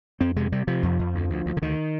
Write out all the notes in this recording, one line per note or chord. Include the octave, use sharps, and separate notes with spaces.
F2 C4
C3 G#3
C3 G3
C3 F3
F2
F2
D2
D2
D2
D3
D2 D#3